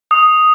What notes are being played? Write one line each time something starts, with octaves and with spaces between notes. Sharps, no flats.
D#6